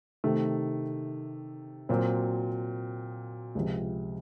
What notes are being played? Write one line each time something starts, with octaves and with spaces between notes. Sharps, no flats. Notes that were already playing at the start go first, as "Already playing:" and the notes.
C3 D#3 A3
A#2 F#3 C4
C#2 C3 F3